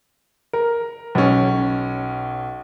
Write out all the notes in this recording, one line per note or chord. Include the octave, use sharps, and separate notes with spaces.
A#4
B1 C#4